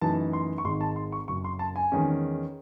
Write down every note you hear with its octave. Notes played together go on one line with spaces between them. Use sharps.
F#2 E3 A3 D#4 A5
C6
C#6
G#1 G#2 D#3 G#3 D#4 C6
A5
C6
C#6
F#1 F#2 C#3 F#3 C#6
C6
A5
G#5
E2 D#3 G#3 C#4